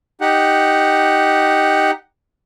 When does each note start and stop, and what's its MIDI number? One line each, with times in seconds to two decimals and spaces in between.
0.21 1.91 63
0.21 1.91 67
0.21 1.91 78